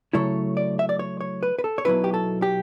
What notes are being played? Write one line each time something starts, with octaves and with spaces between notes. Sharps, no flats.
C#3 F#3 A3 E4 C#5
D5
E5
D5
C#5
C#5
B4
B4
A4
C#5
B1 B2 F#3 C#4 E4 B4
G4
A4
G4